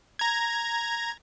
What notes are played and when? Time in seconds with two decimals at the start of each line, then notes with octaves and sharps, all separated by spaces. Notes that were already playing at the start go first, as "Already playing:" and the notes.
0.19 A#5 G#6